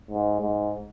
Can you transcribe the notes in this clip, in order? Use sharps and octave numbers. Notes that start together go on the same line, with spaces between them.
G#2
G#2